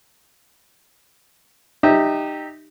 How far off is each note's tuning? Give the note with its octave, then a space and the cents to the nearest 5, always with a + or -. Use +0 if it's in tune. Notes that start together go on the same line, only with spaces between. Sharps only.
D#4 -25 G4 +0 E5 -30